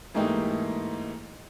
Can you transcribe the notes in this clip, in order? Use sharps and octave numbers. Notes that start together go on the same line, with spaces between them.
G#2 E3 A3 A#3 D#4 G4